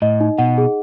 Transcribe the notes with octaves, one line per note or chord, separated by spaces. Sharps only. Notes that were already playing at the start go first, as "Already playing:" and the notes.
A2 D#5
D#4
B2 F#5
G#4